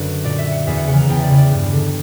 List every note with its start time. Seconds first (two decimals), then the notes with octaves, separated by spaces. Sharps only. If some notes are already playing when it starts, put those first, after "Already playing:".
Already playing: F#2 D3 B4
0.24 A#2 D5
0.38 E5
0.52 F#5
0.67 E2 E5
0.77 F#5
0.87 C#3 E3 F#5
0.98 A#5
1.09 E2 G5
1.23 D5
1.30 C#3 E3
1.37 D5
1.51 G2
1.73 D3